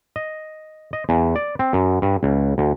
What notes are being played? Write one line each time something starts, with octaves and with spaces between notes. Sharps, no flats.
D#5
D#5
E2
D5
C4
F#2
G2
C#2
D2